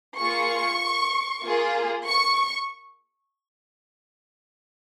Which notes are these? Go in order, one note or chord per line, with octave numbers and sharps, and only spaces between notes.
A#3 F4 G#4 C#6
A#3 F4 G#4
C#6